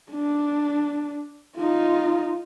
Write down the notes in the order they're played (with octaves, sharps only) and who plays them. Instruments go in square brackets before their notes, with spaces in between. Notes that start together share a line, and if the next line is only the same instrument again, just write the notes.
[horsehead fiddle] D4
D#4 F4